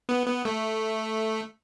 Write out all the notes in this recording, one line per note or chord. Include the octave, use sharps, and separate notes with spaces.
B3
B3
A3